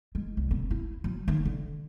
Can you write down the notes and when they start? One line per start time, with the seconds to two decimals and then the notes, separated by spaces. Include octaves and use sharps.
0.15 G#3
0.37 C2
0.51 C4
0.71 E4
1.04 F#3
1.28 D#3
1.45 D3